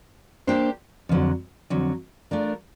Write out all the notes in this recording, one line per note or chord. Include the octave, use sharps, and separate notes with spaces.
A#3 D4 G4 C5
F2 D3 F#3
F2 D3 F#3
A3 D4 F4 A#4